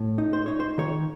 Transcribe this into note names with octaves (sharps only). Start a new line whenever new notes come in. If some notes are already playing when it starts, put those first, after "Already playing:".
Already playing: A2
D#4
C5
D#4 C#5
C5
D#3 C#5